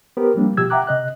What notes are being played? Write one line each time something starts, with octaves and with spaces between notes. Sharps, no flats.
B3 G4 A#4 C5
F3 G3 A#3 C4 D4
B2 F3 G4 E6 G#6
E5 F#5 G5 A#5 D6 F#6
C3 D#5 F#6